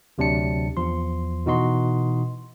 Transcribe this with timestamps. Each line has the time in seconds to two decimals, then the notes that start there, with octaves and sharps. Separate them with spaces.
0.18 D2 C3 F#3 D4 A5 C#7
0.77 E2 F3 C6
1.46 B2 E3 D#4 F#4 D#5 C6